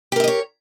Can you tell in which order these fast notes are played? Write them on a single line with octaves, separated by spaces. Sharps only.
G4 A#4 E5 D#5 C#5